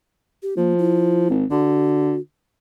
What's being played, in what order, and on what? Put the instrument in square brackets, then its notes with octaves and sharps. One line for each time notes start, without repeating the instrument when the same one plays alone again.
[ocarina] G4
[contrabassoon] F3 [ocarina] A#3
[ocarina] E4
[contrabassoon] G#1
[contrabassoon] D3 [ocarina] F#4